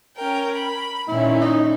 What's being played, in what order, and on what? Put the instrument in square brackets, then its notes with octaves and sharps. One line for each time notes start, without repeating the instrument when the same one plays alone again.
[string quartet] C#4 A#4 G5
B5
[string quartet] A#2 D#3 C#4 [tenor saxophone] E4
[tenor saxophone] D#4